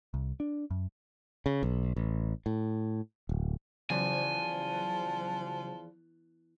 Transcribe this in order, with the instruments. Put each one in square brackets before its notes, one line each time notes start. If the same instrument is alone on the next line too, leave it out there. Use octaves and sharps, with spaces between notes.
[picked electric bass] C2
D4
F#2
[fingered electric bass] C#3
B1
A1
A2
D1
[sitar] E2 [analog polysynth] C#3 F#3 C5 [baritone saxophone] F3 [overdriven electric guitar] G#5